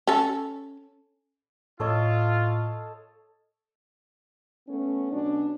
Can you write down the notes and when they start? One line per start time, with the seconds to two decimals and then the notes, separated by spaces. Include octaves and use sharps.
0.07 C#4 A4
1.80 A2 F4 A4 C#5 D#5
4.68 A3 B3 C#4
5.11 B2 F#3 C#4 D4